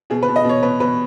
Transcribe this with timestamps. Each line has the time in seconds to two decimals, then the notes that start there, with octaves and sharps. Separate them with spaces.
0.10 B2 G#4
0.23 B4
0.28 B2
0.36 D#5
0.44 B2 C#5
0.63 B2 B4
0.80 B2 B4